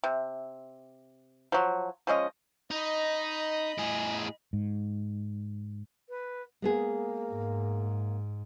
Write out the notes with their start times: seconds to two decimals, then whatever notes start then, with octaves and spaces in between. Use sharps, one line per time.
0.04 C3
1.52 F3 F#3
2.07 F3 G#3 C#4 D#5
2.71 D#4 D#5 B5
3.78 A2 G#4
4.53 G#2
6.09 B4
6.62 G#3 A#3 B3 G#4
7.29 G#2